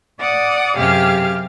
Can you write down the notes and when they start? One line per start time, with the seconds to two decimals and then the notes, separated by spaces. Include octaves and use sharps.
0.19 D5 F#5 D6 D#6
0.76 F#2 C3 G4 G#4 F5 F6